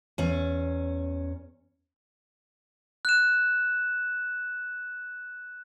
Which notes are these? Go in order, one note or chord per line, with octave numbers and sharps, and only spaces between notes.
E2 C#4
F#6 E7